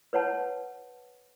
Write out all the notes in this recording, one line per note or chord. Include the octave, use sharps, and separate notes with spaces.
B4 C#5 F#5 A5